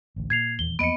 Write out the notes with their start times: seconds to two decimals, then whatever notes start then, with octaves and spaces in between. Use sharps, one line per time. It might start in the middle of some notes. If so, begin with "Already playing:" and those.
0.16 A1 D2
0.30 A#2 G#6 C7 F7
0.59 D#1 E2 G7
0.79 E2 F3 A#3 B3 D#5 C#7 D7